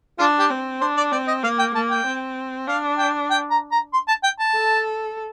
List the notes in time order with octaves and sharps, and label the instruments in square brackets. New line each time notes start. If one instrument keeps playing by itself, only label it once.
[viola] D4 [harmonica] F4
[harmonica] G4
[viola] C4
[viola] D4 [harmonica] C5
[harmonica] D5
[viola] C4 [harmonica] D5
[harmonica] D#5
[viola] A#3 [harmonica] F5
[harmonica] G5
[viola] A#3 [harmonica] A5
[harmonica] G5
[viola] C4
[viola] D4 [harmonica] F5
[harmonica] G5
G5
A#5
A#5
C6
A5
G5
A5
[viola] A4